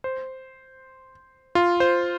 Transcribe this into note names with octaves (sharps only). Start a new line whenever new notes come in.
C5
F4
C5